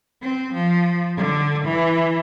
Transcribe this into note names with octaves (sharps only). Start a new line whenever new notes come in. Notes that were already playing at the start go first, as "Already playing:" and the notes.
C4
F3
D3
E3